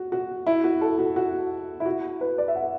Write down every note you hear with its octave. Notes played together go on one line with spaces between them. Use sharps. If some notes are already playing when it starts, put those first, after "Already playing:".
Already playing: F#4
F#4
E4
F#4
A4
F#4
F#4
E4
F#4
B4
D5
E5
F#5